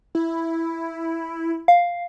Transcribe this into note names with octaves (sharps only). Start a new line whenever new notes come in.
E4
F5